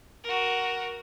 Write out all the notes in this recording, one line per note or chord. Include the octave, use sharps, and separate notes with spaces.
F#4 A#4